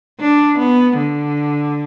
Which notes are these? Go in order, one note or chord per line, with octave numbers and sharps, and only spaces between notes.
D4
B3
D3